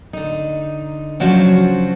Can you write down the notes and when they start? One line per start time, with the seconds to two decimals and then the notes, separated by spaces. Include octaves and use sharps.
0.13 D3 D#4
1.20 C#3 F3 F#3 D4 F#4 C5